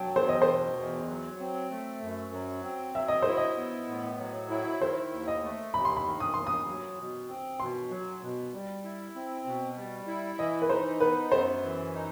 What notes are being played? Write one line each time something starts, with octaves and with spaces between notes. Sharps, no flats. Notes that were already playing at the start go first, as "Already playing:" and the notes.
Already playing: F#3 G5 A5
E2 C5
D#5
C5
B2
E2
F#3
C4
A3
F#2
F#3
C4
F#3 E5
D#5
E4 C5
D#5
B3
A2
F#3
E4
D#3 C5
D#2
D#5
A3
D#2 B5
C6
B5
D#3
D#6
D#2 C6
D#6
F#3
B2
C4
B2 C6
F#3
B2
G3
E4
C4
B2
G3
E4
E3 D#5
B4
D#4 C5
B3 B4
F#2 C5
E3
D#4